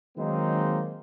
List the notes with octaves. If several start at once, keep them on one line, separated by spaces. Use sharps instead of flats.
D#3 F#3 G#3 A#3 C4 D#4